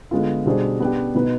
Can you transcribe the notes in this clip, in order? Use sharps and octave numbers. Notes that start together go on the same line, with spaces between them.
D3 G#3 B3 F4
B2 G3 D4 G#4 C5
B3 D4 G4
B2 B3 D#4 B4